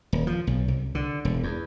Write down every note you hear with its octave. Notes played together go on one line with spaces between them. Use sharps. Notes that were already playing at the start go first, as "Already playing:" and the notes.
D#1
F3
B1
C2
D3
E1
E2